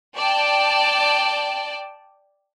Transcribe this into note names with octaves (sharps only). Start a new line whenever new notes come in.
D5 G5 A5